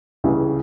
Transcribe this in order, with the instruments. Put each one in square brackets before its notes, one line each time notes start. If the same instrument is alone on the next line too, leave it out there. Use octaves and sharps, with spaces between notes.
[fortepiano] C#2 C#3 E3 G3